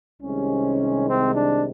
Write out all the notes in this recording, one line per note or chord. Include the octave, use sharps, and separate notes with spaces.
C2 C3 D#3 G#3 C#4
C4
D4